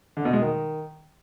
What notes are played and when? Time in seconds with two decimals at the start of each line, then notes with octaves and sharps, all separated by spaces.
0.17 D3
0.25 B2
0.33 G#3
0.41 D#3